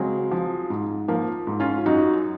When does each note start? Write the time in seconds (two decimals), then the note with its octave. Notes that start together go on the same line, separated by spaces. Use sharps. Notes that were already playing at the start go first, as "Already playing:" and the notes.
Already playing: C#3 F#3 G#3 C4
0.31 F3
0.70 G#2
1.08 F3 A#3
1.47 G#2
1.60 C#4 F4
1.86 F#2 D#4 F#4